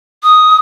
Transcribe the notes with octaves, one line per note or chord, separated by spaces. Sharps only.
D#6